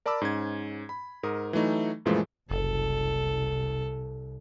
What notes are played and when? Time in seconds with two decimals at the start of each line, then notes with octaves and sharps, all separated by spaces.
0.06 A#4 D5 A5 B5 D6 E6
0.21 G#2 C#4 G#6
0.89 B5
1.23 G#2 A#4 D#6
1.53 E3 F#3 A3 D#4
2.05 F#2 A#2 E3 F3 G#3 A3
2.51 F#1 C2 A4